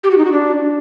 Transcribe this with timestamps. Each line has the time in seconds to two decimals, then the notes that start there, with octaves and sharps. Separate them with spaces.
0.04 G4
0.11 F#4
0.18 D#4
0.25 F#4
0.32 D4